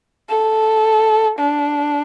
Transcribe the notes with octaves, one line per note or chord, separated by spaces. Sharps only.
A4
D4